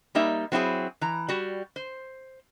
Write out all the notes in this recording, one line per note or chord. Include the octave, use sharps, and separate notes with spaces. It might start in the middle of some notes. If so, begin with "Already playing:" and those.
G3 A#3 D#4 E5
F#3 C4 E4 F#4 G#4
E3 A#5
G3 F#4
C5